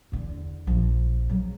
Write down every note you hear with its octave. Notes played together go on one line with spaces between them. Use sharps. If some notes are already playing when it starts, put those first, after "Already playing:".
E2 D3
A#1 F3
C#3 F#3